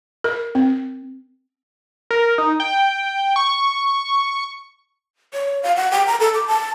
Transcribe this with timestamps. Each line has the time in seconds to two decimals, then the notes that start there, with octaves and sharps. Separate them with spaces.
0.24 A#4
0.55 C4
2.11 A#4
2.38 D#4
2.60 G5
3.36 C#6
5.33 C#5
5.63 F5
5.76 F#5
5.91 G5
6.07 A#5
6.20 A4
6.34 D6
6.47 A5